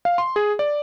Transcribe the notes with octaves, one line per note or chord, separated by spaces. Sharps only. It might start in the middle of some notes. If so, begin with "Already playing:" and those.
F5
C6
G#4
D5